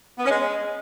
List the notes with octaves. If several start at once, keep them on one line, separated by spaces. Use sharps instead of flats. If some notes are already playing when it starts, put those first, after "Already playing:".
B3
C#4
G#3